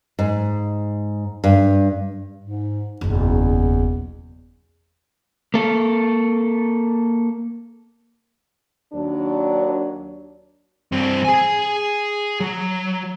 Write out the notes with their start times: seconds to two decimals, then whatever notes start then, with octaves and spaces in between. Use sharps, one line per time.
0.19 G#2
1.44 G2
2.42 G#2
3.01 F#1 B1 E2
5.54 A#3 A4
8.93 D#2 F#3 D4
10.92 G2 C4
11.25 G#4 G#5
12.40 F#3